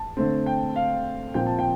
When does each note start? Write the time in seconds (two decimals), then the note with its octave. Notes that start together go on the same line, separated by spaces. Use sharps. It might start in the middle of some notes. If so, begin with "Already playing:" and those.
Already playing: A5
0.17 D3 A3 C4
0.46 G5
0.76 F5
1.34 A#2 F3 C4 G5
1.46 A5
1.59 G5